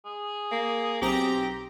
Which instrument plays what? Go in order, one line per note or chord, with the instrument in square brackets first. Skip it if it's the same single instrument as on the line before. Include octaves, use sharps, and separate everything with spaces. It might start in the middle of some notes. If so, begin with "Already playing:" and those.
[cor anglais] G#4
[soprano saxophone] A#3
[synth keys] B1 C4 A#5 [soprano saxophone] G4